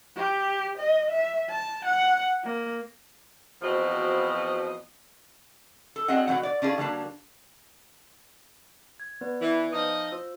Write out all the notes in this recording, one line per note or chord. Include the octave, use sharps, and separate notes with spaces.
G4
D#5
E5
A5
F#5
A#3
E2 B2 F3 C4 F#4 D#5
A4
F#3 C4 D4 G#4 D#5 F#5
B2 D#3 F#3 F#5
D5
C#4 D4 F4 G#4
D3 F#3 G3 A#3 D4 A5
G#6
B3 B4 D5
E3
F3 D#4 D#5
F4 C5 E6